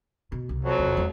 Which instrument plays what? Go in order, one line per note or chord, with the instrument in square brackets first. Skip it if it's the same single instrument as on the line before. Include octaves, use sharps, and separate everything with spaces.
[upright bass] B2
C2
[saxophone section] F2 F#3
[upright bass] F1 E2
E2 G#3